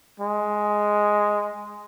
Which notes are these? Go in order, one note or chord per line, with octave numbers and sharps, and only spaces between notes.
G#3